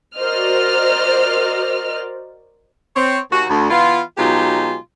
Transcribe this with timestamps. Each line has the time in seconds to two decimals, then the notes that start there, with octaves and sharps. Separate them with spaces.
0.17 F#4 A#4 C5 D5 D#5 F6
2.96 C4 C#5
3.31 D#2 F#4
3.49 D2
3.70 E3 B3 E4 F4
4.18 B2 F#3 G#3 D#4 F4 G4